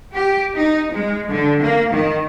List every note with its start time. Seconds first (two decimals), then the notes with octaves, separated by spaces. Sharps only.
0.13 G4
0.56 D#4
0.91 G#3
1.30 D3
1.61 A#3
1.91 D#3